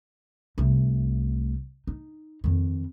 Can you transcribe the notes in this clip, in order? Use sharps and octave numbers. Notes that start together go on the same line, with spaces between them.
C2 A3
D#4
F2 D#3